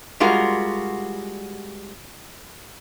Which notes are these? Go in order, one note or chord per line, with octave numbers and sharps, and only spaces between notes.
G3 G#3 F4 F#4 A#4